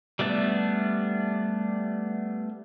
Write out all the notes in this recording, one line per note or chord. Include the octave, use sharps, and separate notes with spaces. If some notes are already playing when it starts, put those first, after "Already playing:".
G3 A3 B3 D4